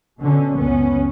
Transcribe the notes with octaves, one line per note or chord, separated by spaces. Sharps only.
B2 D3 C#4
C#2 F#2 B3 C#4